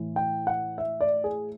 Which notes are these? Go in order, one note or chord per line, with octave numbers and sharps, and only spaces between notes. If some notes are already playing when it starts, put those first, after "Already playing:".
Already playing: A2 E3
G5
F#5
E5
D5
G#4